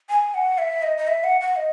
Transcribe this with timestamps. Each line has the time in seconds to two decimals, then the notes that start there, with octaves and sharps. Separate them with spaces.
0.09 G#5
0.34 F#5
0.58 E5
0.83 D#5
0.97 D#5
1.07 E5
1.24 F#5
1.41 F#5
1.56 D#5